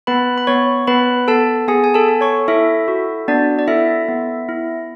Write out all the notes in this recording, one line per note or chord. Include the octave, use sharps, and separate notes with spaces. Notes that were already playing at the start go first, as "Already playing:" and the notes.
B3 B4 B5
B5
B3 C#5 C#6
B3 B4 B5
B3 A4 A5
B3 G#4 G#5
G#5
A4 A5
A4
C#5 C#6
E4 A4 E5
F#4
B3 D4 D5
D5
E4 A4 E5
B3
E4